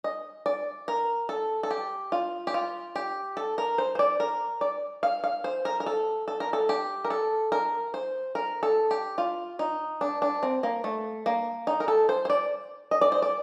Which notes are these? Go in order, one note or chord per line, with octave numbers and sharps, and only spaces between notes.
D#5
D5
A#4
A4
A4
G4
F4
G4
F4
G4
A4
A#4
C5
C5
D5
A#4
D5
F5
F5
C5
A#4
A#4
A4
A4
A#4
A4
G4
A#4
A4
A#4
C5
A#4
A4
G4
F4
D#4
D4
D4
C4
A#3
A3
A#3
D#4
A#4
A4
C5
C5
D5
D#5
D5
C5
D5